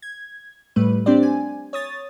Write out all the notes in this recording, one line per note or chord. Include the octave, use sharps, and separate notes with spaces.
G#6
A2 G3 A3 B4
C4 D4 G4 C5 D5
G#5
C#5 D#6 A6